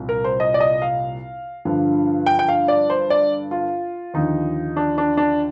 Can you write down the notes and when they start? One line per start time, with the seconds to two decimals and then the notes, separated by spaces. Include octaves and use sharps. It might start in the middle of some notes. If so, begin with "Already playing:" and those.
Already playing: C2 A#2 F3
0.09 A#4
0.24 C5
0.40 D#5
0.54 D5
0.60 D#5
0.82 F5
1.65 G2 D3 F3
2.26 G5
2.39 G5
2.48 F5
2.68 D5
2.90 C5
3.10 D5
3.51 F4
4.14 D#2 D3 F3 D#4
4.77 D4
4.98 D4
5.17 D4